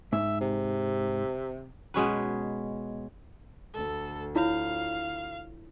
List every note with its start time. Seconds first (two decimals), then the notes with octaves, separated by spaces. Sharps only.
0.13 G#2 E5
0.41 C3
1.94 B2 G#3 C#4 B4
3.75 D2 A4
4.36 E4 F4 C#5 F5